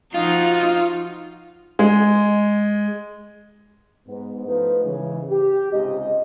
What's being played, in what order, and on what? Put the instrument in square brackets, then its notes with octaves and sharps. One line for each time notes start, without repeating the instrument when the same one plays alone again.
[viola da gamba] F3 D#4 F#4 [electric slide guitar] F4
[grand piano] G#3
[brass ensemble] G#2 B3
F3 A3 B3 D#4 E4 B4
G#2 C#3 E3
G4
C#2 G#2 C3 G#3 D#5